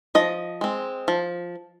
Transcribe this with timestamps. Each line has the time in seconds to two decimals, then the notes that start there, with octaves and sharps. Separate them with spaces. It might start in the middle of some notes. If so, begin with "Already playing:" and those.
0.15 F3 D#5
0.61 G#3 C4
1.08 F3